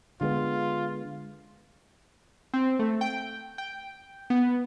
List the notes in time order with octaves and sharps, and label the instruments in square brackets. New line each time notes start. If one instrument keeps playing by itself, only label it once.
[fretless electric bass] D3 G#3 B3 [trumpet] F4
[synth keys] C4
A3
G5
G5
B3